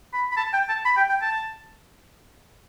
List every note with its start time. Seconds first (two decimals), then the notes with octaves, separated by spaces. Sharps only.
0.13 B5
0.32 B5
0.37 A5
0.53 G5
0.69 A5
0.85 B5
0.97 G5
1.09 G5
1.22 A5